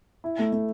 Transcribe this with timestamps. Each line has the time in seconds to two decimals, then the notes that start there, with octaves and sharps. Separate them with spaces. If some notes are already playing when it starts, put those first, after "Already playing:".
0.24 E4
0.39 A3
0.52 A3